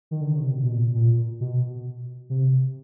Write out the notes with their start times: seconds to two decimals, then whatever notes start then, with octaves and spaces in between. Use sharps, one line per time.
0.11 D#3
0.21 D3
0.31 C#3
0.39 C3
0.50 B2
0.65 B2
0.72 A#2
0.94 A#2
1.40 B2
2.30 C3